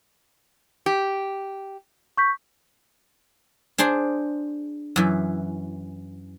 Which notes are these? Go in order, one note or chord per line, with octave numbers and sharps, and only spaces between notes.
G4
C#6 G6 B6
D4 G#4 C5 C6
F#2 E3